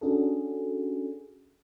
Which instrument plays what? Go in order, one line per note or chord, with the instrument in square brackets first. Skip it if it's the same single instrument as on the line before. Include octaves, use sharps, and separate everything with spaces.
[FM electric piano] C#4 D4 F#4 G#4 A4